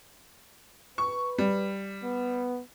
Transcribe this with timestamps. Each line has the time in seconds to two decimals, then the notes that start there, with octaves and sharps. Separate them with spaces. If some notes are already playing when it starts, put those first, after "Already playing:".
0.98 B4 C#6
1.38 G3
2.04 B3